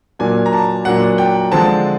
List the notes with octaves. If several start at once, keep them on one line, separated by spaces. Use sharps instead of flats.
A#2 F#3 A#3 D4 G#5
A#5
A5
A#2 F#3 A#3 D4 F#5
G5
D3 F3 G#3 C4 A5